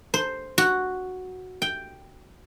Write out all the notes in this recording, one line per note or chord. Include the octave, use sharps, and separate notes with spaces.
C5
F#4
G5